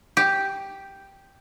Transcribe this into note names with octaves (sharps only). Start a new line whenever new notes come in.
G4